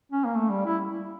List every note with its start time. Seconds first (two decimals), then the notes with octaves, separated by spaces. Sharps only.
0.12 C#4
0.25 A#3
0.37 A3
0.50 G3
0.66 E4